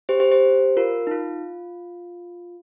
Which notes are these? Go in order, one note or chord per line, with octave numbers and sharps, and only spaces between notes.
G4 C5
G4 C5
G4 C5
F4 A#4
D#4
F4